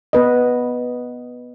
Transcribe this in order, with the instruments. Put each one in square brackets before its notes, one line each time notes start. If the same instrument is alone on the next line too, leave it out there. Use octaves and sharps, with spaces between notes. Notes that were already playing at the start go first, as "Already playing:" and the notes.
[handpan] B3 B4 D#5